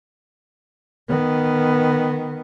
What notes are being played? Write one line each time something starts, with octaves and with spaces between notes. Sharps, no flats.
D#3 B3